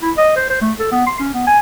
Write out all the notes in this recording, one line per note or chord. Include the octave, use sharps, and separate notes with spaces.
E4
D#5
C5
C5
A3
A4
B3
C6
C#4
B3
G#5